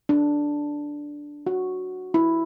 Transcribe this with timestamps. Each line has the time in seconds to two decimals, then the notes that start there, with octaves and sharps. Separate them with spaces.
0.09 D4
1.47 F#4
2.14 E4